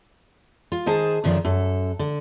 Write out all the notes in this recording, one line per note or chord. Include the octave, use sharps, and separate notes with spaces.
F4
D#3 G#4 C5 A5
F#2 D3 D#3 F3 D4
F#2 A4
D3